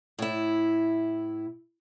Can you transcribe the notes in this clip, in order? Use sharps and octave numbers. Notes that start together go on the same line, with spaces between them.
A2 E4